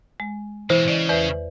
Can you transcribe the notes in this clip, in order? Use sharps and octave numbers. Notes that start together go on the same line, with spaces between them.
G#3
B2 E3 A#3 C5
C#3 D5 D#5
E2 B4 D5 E5